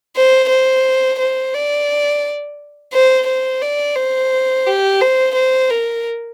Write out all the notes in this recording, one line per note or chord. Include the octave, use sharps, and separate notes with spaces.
C5
C5
C5
D5
C5
C5
D5
C5
G4
C5
C5
A#4